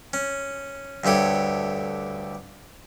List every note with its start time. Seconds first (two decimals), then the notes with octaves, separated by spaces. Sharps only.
0.13 C#4
1.04 D2 G2 A3 G4 C#5